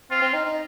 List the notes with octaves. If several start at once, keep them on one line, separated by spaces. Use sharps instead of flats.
C4 F4
C4
D#4
D#4